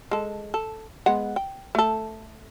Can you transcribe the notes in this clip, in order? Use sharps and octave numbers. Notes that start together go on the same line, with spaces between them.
G#3 A4
A4
G#3 B3 F#5
G5
A3 A4